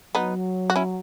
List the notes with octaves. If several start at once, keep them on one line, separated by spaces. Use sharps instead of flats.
F#3 B3 D#4
F#4
C#4 E4